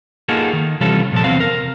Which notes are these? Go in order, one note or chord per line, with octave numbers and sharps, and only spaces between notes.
A#3 D#4 F4 F#4 G#4 A4
D#3
C3 E3 G3 C#4 F4 A4
A#2 F3 A4
E2 C3 C4 F#4 F5
A#4